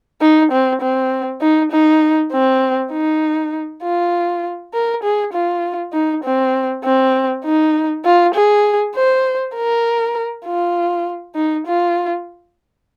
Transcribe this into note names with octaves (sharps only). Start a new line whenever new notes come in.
D#4
C4
C4
D#4
D#4
C4
D#4
F4
A#4
G#4
F4
D#4
C4
C4
D#4
F4
G#4
C5
A#4
F4
D#4
F4